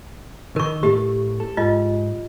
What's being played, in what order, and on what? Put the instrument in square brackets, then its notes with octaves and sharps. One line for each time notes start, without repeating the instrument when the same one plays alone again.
[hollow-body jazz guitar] D#3 [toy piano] A#4 C#6
[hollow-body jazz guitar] A2 A3 [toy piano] G4
[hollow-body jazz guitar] A4
[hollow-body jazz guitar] G#2 [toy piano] F4 D#5